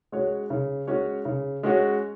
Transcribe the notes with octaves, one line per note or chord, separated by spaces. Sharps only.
G#3 C#4 F#4 C#5
C#3
G#3 C#4 F#4 C#5
C#3
G#3 C#4 F#4 C#5